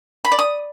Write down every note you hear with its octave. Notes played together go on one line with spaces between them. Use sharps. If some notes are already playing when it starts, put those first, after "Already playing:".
B5
D5
D#6